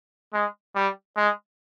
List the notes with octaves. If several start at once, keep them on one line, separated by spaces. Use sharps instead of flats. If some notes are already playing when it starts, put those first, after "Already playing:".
G#3
G3
G#3